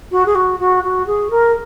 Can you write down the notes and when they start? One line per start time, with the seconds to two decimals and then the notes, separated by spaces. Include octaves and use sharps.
0.11 F#4
0.26 G#4
0.35 F#4
0.59 F#4
0.83 F#4
1.06 G#4
1.30 A#4